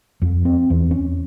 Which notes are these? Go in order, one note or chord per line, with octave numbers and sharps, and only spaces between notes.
F2
C4
E2
C#4